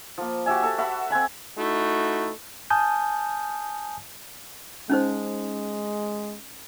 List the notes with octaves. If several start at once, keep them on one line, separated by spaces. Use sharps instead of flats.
F3 A#3
F#4 G4 E5 G#5
A4 E5 A5
F#4 E5 F#5 B5
C4 F#5 G#5 B5
A3 D#4 E4 F#4
G#5 A5 D#6 F6 G6
G#3 C#4 D#4 C5